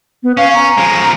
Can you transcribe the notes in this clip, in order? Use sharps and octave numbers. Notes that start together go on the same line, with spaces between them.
B3
C#4 F5
A#5
F3 G#3